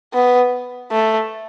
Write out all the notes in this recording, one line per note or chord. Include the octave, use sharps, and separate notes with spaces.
B3
A3